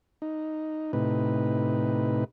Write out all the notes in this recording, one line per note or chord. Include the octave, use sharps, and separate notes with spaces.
D#4
A2 C3 D#4 B4